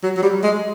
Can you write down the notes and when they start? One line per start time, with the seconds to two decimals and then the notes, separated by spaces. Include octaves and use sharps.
0.03 F#3
0.17 F#3
0.22 G3
0.43 G#3